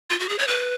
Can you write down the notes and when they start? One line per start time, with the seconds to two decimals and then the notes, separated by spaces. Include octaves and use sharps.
0.10 F4
0.19 F#4
0.29 G#4
0.39 C#5
0.48 B4